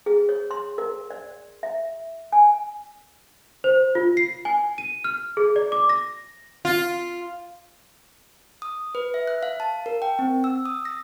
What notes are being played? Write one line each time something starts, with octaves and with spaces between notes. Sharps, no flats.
G#4
C#5
C6
A#4
D5
E5
G#5
C5
F4
C7
G#5
D#7
F6
G#4
D5
D6
A#6
F4
D#6
B4
E5
F#6
F5
A5
A#4
G5
C4
E6
D#6
A#6